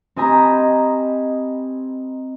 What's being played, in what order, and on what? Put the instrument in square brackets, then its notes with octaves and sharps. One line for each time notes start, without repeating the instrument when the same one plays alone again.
[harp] C4 G4 D#5 G#5 A#5 B5